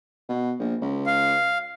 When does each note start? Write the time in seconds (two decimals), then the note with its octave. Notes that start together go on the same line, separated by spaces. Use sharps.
0.29 B2
0.59 A#1
0.82 C#2
1.06 F5